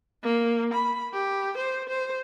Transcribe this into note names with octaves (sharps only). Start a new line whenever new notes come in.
A#3
B5
G4
C5
C5